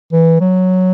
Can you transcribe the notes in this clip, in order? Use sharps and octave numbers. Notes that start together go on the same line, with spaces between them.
E3
F#3